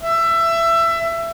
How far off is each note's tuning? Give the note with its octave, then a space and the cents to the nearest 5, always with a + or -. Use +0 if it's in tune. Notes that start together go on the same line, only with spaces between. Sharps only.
E5 +20